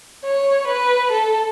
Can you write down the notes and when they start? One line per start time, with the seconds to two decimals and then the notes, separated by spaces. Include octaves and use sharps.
0.24 C#5
0.68 B4
1.11 A4